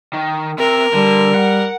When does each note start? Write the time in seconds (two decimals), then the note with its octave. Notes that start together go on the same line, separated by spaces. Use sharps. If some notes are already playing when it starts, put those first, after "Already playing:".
0.13 D#3
0.59 C3 A#4
0.94 D3 G3
1.35 F#5